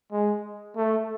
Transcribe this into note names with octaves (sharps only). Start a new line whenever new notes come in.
G#3
A3